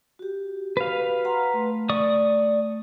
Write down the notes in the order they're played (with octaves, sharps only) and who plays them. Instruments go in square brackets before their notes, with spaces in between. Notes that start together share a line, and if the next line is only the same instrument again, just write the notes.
[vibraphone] F#4 G4
[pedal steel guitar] B4 F5
[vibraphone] F#5 A#5 C6
A3
[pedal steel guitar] D5 C#6 D#6